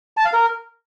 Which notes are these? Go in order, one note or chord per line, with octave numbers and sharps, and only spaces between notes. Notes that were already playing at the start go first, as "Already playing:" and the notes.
A5
F5
A#4